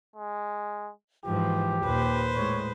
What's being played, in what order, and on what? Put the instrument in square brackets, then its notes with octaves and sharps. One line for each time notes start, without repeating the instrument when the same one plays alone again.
[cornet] G#3
[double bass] G#2 E3 [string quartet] F3 [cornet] G4
[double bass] D#2 A#2 [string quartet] B4 C5
[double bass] A2 G#3 [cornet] C#5